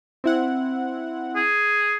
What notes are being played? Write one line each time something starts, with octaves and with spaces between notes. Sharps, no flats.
C4 E4 F#5
G#4